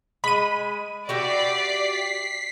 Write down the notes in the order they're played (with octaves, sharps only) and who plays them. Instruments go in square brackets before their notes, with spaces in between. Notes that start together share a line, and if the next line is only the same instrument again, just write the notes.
[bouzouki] G#3 [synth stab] B5 D#7
[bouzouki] F#4 G4 E5 [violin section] D5 [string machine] B6 C7